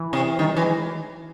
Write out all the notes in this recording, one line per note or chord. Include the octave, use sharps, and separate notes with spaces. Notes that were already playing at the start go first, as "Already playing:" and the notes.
Already playing: E3
C3
D#3 G3
E3 F#3
G#3